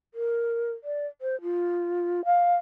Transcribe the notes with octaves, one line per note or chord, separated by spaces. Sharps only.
A#4
D5
C5
F4
F5